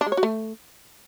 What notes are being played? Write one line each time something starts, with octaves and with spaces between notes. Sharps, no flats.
D4
G#3
C#5
F#4
A3